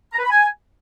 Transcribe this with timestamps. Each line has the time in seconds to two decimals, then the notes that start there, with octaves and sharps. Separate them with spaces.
0.12 A#5
0.18 B4
0.24 B5
0.30 G#5